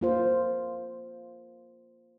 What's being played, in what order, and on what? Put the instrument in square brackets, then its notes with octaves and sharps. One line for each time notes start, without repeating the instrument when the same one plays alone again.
[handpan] A#3 F4 C5